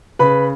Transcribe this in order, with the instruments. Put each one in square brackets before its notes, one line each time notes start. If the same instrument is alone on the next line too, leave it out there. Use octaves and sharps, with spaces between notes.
[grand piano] C#3 B4 B5